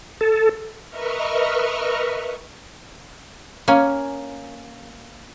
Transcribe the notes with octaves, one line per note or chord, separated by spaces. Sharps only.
A4
A#4 B4 D#5 E5 C#6 F6
A#3 C#4 G#5